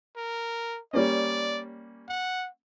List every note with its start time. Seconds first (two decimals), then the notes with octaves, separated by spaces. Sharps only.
0.16 A#4
0.93 G3 A#3 C#4 D5
2.08 F#5